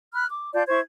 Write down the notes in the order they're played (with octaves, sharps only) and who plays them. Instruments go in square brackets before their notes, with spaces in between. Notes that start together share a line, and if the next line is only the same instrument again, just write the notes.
[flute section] B5 F6 F#6
D6
F4 D5 A5 G6
E4 C5 C#6 G#6